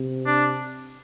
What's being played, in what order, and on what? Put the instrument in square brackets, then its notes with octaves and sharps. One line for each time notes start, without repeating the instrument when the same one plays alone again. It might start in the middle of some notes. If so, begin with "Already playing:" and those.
Already playing: [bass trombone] C3
[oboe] D4